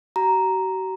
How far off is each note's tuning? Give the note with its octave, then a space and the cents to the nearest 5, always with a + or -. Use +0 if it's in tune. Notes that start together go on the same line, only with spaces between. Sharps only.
F#4 +45 A#5 +0